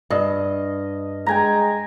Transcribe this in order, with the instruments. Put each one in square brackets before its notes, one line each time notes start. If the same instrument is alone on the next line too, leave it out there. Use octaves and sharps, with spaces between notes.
[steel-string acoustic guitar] G2 [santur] D#5
[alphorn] G#3 [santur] G5 G#5 A#5